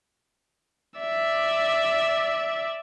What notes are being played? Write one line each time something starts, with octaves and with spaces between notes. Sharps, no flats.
D5 E5